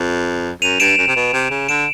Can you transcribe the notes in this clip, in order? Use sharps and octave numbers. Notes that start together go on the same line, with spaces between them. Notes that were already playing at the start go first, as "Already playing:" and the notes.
Already playing: F2
F#2 D#7 F7
G2 D7 E7
F#2
C3
B2
C3
C#3
D3 D7 E7